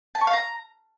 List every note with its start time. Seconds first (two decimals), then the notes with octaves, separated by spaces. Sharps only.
0.15 A5
0.21 C#6
0.27 F5
0.33 A#5